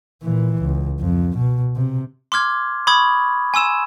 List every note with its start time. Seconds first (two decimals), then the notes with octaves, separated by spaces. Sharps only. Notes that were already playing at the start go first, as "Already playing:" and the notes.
0.23 A#2 E3
0.63 C#2
1.00 F2
1.38 B2
1.76 C3
2.32 C6 D6 F6 G#6
2.87 B5 C#6 D#6 G#6
3.54 G#5 C6 E6 E7